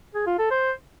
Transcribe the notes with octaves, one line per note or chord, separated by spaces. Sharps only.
G#4
F4
A4
C5